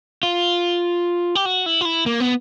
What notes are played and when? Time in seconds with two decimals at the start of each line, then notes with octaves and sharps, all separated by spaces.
0.23 F4
1.35 G4
1.46 F#4
1.66 E4
1.81 F4
1.85 E4
2.06 A#3
2.20 B3